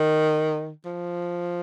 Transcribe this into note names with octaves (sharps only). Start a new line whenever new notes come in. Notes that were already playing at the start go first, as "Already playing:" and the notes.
Already playing: D#3
F3